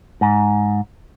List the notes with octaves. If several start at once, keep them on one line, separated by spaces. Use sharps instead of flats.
G#2